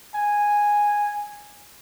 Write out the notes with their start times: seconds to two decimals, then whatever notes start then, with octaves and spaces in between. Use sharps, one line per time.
0.15 G#5